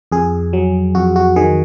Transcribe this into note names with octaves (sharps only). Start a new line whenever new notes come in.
F2 G#4
F#3
F2 F#4
F#4
D#3 G#4